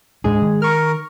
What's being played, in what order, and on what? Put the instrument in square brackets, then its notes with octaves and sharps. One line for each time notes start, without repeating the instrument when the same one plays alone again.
[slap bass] D2 G#2 D4 [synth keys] G#3 G#4
[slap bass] D#3
[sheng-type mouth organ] A#4 [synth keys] C#6 F6